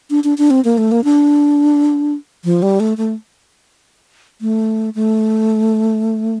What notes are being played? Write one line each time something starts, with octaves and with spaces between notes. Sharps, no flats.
D4
D4
D4
C4
A#3
A3
A#3
D4
F3
G3
A3
A3
A3
A3